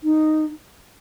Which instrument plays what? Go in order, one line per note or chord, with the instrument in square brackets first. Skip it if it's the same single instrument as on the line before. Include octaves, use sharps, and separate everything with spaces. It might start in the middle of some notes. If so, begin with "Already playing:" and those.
[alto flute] D#4